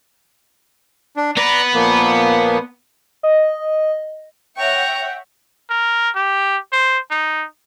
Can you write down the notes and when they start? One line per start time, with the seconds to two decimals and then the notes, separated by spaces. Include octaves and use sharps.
1.17 D4
1.37 B3 B4 D5 A#5
1.74 A#2 F3 A#3
3.23 D#5
4.57 C#5 E5 F#5 G5 A#5 C#6
5.71 A#4
6.15 G4
6.72 C5
7.11 D#4